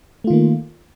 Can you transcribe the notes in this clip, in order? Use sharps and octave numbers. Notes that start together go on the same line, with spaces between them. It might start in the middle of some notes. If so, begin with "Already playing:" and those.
D#3 A3 A#3 F4